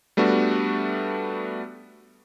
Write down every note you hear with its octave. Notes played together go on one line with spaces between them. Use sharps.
G3 A3 B3 D4 F#4